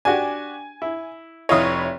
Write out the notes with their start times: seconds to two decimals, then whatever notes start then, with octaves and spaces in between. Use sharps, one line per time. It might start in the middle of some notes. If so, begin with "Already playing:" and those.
0.05 D4 F#4 G4 G#5
0.82 E4
1.49 F1 E4 C#5 D#5 F5 D#6